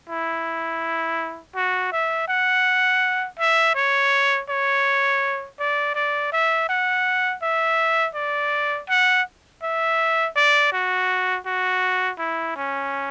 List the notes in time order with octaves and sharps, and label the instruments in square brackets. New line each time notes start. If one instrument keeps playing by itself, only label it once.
[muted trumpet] E4
F#4
E5
F#5
E5
C#5
C#5
D5
D5
E5
F#5
E5
D5
F#5
E5
D5
F#4
F#4
E4
C#4